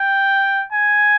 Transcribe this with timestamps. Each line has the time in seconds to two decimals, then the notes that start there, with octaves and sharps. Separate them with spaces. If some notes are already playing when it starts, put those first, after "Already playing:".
Already playing: G5
0.73 G#5